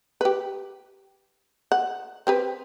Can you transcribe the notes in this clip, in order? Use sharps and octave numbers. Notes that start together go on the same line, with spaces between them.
G4 B4
F#5
C4 G4 B4